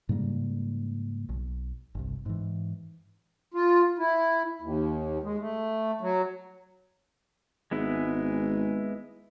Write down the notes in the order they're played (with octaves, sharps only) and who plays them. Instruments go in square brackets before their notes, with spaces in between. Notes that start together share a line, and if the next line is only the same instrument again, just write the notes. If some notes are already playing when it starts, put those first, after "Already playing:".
[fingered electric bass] G#2 C#3 G3 A#3
B1
G1 C2
G#2 E3
[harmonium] F4
E4
D#2
G#3
A3
F#3
[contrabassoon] G#1 [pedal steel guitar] G#3 B3 E4